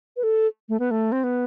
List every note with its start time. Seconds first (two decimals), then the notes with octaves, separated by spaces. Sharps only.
0.17 B4
0.23 A4
0.69 A3
0.80 B3
0.91 A3
1.12 C4
1.24 B3